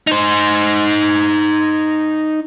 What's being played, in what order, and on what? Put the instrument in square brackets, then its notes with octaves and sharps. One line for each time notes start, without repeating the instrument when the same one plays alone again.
[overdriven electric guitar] D#4 C5